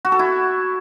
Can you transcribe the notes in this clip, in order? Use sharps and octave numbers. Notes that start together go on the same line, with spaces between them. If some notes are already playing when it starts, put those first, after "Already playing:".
F#4
A4
E4